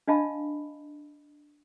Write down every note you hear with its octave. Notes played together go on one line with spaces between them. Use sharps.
D4 D#5 F5 A5 B5